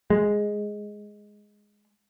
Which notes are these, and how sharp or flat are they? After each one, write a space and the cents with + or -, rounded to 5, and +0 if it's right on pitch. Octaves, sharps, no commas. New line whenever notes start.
G#3 +0